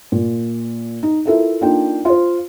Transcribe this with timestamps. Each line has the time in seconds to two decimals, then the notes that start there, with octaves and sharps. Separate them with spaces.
0.12 A#2
1.03 D#4
1.25 E4 F4 A4 A#4 E5
1.61 A#3 D4 D#4 F4 A4 G5
2.05 F4 C5